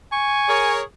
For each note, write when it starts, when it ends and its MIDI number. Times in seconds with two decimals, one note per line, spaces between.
0.12 0.73 80
0.12 0.76 85
0.49 0.81 68
0.49 0.81 70
0.49 0.81 73